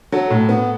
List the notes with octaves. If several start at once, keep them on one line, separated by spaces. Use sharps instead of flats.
F#3 A4
A2
B3